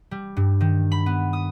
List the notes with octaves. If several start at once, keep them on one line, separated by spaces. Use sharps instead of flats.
G3
G2
D#3
B5
B3
D#6